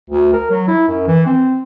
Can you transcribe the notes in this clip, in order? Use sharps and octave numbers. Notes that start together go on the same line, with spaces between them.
D2
A#4
F#3
E4
F#2
E3
C4